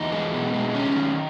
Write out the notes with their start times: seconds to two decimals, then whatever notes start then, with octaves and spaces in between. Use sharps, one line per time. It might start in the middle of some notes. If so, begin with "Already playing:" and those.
Already playing: E2 D#4
0.12 G#3
0.33 B2
0.54 G#3
0.74 D#3 C#4
0.96 D#3